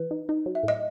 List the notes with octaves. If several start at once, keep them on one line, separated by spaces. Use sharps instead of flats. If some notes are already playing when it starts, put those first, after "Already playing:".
Already playing: E3 B4
D#4
D#4
F#3
E5
A2 D#5